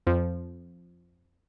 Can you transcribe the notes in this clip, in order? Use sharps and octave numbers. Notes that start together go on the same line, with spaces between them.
F2 F3